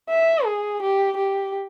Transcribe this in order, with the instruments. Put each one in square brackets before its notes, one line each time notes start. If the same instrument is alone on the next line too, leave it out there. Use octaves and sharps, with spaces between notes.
[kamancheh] E5
G#4
G4
G4